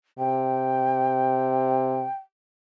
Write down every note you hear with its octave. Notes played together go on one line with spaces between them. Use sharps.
C3 G5